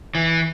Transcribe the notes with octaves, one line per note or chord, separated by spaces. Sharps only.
E3